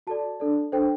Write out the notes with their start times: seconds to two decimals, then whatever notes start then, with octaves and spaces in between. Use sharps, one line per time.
0.07 F#4 A4 D5 A5
0.40 D4 A4 D5
0.72 D4 A4 C5 G5